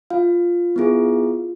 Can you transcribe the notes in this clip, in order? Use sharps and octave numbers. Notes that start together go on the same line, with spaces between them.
F4 F5
B3 E4 G#4